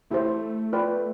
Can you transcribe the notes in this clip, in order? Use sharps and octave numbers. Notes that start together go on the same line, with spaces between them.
A3 E4 G4 C5
F4 B4 D5 G5 C6